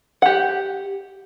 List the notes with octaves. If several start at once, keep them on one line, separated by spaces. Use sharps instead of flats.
G4 F#5